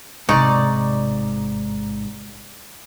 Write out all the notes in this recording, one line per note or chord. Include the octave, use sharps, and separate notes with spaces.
A1 G#2 C3 D#4 D5 C#6